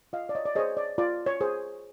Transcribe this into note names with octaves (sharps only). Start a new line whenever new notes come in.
F4 D#5 F5
D5
C#5 D#5
D5
G#4 C5 C#5 D#5
D5
F4 D5
C#5
G#4 C5